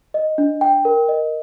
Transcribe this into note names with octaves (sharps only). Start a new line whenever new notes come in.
D#5
D4
G5
A#4
D#5